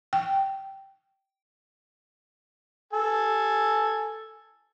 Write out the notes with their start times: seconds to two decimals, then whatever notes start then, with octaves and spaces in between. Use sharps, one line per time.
0.13 G5
2.93 A4 G#5